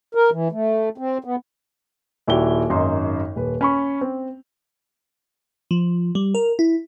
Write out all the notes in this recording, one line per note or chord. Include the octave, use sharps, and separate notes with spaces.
A#4
E3
A3
C4
B3
D#1 E4 F#4 G4 D5 G7
G#1 F#2 D#4 C6
D#1 B4
C#4 B5 C#6
C4
F3
G3
A#4
E4